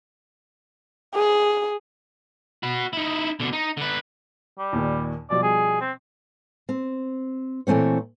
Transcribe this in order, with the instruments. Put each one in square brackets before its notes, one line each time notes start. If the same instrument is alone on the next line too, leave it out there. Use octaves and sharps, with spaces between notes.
[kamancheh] G#4
[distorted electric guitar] F#4 B5
D#4 E4
B2 D3
D#4
D3 B4
[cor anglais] G3
[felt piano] D#2 A#2 D#3
[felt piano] B2 F3 G3 [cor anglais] D5
[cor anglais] G#4
C4
[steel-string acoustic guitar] C4
A#2 E3 A3 C4 C#5